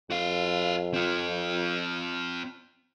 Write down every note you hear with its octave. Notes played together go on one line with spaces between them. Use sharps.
F2 F#4 F5
C4 F4